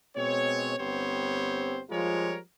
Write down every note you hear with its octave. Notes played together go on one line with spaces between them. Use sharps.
B2 G#3 C4 C#5
G1 B3 C4 G4 C5 C#5
F3 G3 G#3 F4 A#4 C#5